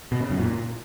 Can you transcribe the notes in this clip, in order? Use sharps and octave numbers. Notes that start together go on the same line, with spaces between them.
B2
C#3
F#2
A#2